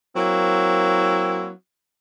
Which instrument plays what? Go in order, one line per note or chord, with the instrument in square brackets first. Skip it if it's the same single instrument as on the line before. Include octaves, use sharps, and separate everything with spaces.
[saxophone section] F#3 A#3 C4 E4